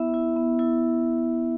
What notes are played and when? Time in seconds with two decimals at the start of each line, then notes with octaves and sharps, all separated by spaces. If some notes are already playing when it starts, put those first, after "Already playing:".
Already playing: B3 E4 E5
0.14 E4
0.36 B3
0.59 E4